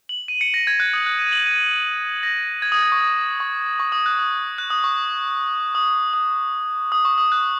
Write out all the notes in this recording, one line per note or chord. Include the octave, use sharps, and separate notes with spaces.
F#7
D#7
C#7
A#6
G#6
F#6
D#6
F#6
D#7
F#7
D#7
A#6
G#6
D#6
G#6
C#6
D#6
C#6
C#6
D#6
F#6
D#6
F#6
D#6
C#6
D#6
D#6
D#6
C#6
D#6
F#6